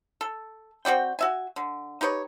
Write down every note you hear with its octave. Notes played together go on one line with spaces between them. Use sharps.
A4
C4 F#4 D5 G5
F#4 E5 G#5
D3
D#4 G4 B4 C#5